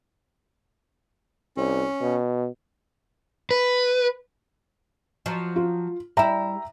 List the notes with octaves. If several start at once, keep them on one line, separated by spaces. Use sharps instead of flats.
C2 C#4
B2
B4
F3 F#3
F4
G3 E4 E5 G5 A#5